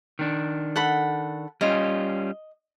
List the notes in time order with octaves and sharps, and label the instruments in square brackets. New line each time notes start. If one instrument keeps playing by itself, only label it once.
[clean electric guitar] D#3 D4
[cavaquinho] A4 F#5 B5
[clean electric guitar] G3 C#4 F4 [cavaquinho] D#5